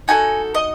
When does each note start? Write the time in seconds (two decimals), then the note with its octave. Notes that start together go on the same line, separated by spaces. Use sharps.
0.08 D#4 F#4 A4 G#5
0.55 D#5